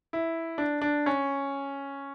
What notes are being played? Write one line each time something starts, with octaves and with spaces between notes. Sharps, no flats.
E4
D4
D4
C#4